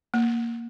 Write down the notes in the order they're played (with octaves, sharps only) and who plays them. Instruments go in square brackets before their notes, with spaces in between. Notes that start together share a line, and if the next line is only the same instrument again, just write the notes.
[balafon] A#3